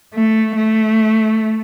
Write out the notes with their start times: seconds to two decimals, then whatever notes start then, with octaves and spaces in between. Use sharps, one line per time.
0.14 A3
0.56 A3